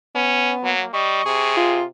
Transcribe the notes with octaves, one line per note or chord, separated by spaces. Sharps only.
B3 C#4
F#3 A#3
G3 D#5 C#6
C3 G#4
F4